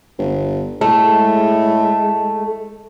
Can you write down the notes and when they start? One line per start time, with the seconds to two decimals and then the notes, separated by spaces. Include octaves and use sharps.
0.18 G1
0.81 A2 G#3 A3